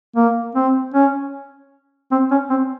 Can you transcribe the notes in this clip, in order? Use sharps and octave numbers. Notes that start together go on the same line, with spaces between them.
A#3
C4
C#4
C4
C#4
C4